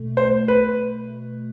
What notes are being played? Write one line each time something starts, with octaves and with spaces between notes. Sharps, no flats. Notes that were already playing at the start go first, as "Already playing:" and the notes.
Already playing: B2 A3
C5
B4